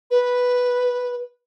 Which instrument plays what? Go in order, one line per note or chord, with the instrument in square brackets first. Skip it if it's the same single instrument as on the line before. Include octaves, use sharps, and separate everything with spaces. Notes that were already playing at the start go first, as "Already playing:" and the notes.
[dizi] B4